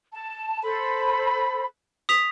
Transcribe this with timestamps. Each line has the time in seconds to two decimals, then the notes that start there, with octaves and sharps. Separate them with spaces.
0.13 A5
0.63 A4 C5 B5
2.09 D#6 B6 F7